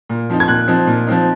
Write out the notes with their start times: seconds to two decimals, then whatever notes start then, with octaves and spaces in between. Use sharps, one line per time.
0.09 A#2
0.30 F3 C4 D#4
0.40 G#6
0.48 A#2 F#6
0.68 F3 C4 D#4
0.87 A#2
1.07 F3 C4 D#4